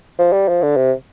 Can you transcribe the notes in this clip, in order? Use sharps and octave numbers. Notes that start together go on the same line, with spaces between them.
F3
G3
F3
D3
C3